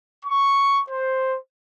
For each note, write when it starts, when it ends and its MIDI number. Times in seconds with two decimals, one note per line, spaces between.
0.25 0.81 85
0.90 1.36 72